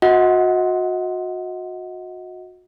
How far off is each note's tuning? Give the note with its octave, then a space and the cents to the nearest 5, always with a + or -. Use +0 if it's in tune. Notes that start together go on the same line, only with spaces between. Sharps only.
F#4 -30 D#5 +35 F#5 +0